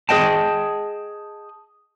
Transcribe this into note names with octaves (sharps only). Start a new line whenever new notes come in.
G#4 B4 D#5 G5 A5